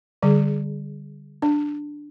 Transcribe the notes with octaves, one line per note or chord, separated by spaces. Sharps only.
D3 G3 G#4
D4